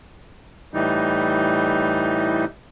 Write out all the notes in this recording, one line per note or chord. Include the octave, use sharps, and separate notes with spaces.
A2 E3 G3 D#4